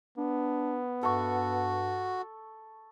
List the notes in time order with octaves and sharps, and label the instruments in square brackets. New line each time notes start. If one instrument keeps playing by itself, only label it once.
[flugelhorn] B3 [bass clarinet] D4
[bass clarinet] G2 [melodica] F#4 [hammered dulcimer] A4 C#6